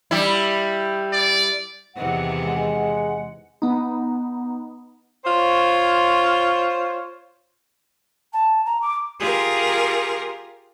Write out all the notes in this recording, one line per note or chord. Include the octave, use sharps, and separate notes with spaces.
G3 E4
D5
E2 C3 D#3 F#5
G#3 F#5
B3 D#4
F4 C5 C#5
A5
A#5
D6
F4 G4 G#4 A#4